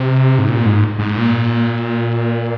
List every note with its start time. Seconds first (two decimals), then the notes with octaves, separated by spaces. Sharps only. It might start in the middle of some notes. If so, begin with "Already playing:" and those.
Already playing: C3
0.39 G#2
0.49 A#2
0.66 G#2
0.99 G#2
1.16 A#2